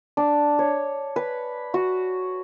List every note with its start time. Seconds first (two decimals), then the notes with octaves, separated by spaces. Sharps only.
0.17 D4
0.59 C#5
1.16 B4
1.74 F#4